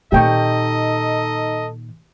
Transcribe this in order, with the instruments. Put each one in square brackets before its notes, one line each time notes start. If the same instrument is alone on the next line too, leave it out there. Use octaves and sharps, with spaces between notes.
[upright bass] A#2 D#3 [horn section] D#4 A4 D#5 [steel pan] G4 G5 C#6